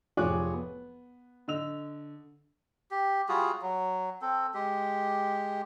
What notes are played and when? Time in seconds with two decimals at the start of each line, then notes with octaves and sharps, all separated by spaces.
0.17 F1 F3 G#4 C#5 D6 F#6
0.53 B3
1.48 D3 D#5 E6 F7
2.91 G4
3.29 G3 F4 F#4 G#4
3.62 F#3
4.22 C4 A4
4.54 G#3 G4